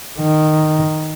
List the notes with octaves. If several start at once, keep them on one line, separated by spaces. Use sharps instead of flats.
D#3